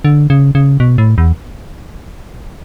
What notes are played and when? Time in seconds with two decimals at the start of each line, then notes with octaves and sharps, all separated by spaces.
0.05 D3
0.30 C#3
0.55 C#3
0.80 B2
0.98 A2
1.18 E2